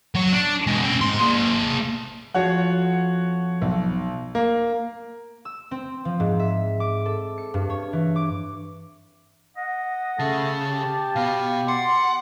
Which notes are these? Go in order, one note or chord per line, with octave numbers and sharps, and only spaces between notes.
F#3 C#5
D4
B2 G#3
C#4 G5
G#2 C6
A#3 G#4
F2 F3 F4 F#4 C#5 F#5
B1
A#3
E6
C4
F3
G#2
E5
D6
A4
C#7
G2
C#5
E3
D6
D#5 F#5
C#3 A3 A5
G4
B2 B3 F5
D5 F#5 C6